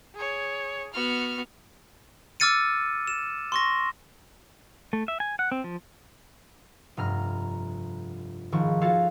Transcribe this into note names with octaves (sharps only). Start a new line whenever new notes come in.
G#4 C#5
B3 F#4 F6
D6 E6 F6 A6 C#7 D#7
E7
C6 C#6 A#6
A3
E5
G#5
F#5
C4
F3
F1 G2 A#5 F6
G#1 D#3 F3 C#6
F4 F#4 A4 C#5 F5